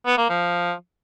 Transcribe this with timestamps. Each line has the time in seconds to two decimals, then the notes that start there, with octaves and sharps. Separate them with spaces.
0.06 B3
0.18 A#3
0.29 F3